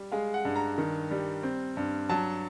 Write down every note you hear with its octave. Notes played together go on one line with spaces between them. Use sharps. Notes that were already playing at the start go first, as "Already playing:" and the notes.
Already playing: G3
G#3 F5
F#5
G2
A#5
D#3
G3
C4
G2
F#3 A5